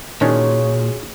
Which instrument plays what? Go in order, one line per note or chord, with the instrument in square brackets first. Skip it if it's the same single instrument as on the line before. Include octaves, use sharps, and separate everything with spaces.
[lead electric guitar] A#2 [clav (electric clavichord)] D#3 C#4 D4 [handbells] F4 F#4 G#4 [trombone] C#5